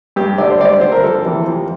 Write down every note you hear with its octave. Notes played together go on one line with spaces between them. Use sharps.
G2 G4
D3 D5
C5
G2 D5
C5
D3 C5
A#4
F2 A4
C3 E3
F2